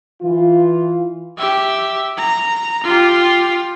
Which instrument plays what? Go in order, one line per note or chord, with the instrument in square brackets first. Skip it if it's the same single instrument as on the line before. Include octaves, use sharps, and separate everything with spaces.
[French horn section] E3 F4
[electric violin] G4 E5
A#5
F4 G4